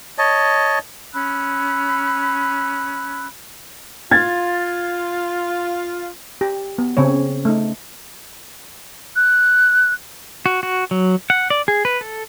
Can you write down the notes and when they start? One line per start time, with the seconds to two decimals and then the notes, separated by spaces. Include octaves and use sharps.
0.18 C#5 D#5 A5
1.13 C#4 B5 E6 F#6
4.11 F4 G#6 A6
6.41 G4
6.78 B3
6.97 C#3 C4 C#4 C#5
7.45 A3 D#4
9.16 F#6
10.46 F#4
10.63 F#4
10.91 F#3
11.30 F#5
11.50 D5
11.68 G#4
11.85 B4
12.01 A4